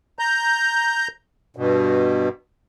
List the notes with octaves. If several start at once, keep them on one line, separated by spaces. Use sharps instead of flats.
A#5 G6
G2 B2